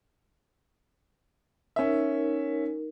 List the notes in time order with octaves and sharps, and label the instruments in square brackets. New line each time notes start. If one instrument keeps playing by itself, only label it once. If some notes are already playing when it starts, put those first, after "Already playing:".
[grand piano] C#4 E5 [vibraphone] D#4 A#4